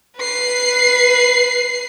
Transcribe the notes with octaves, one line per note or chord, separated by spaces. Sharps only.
B4 C7